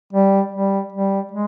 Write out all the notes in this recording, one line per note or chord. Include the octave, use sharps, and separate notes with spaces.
G3
G3
G3
G#3